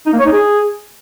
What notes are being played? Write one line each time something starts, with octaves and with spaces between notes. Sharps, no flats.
D#4
A#3
C#5
D#4
G#4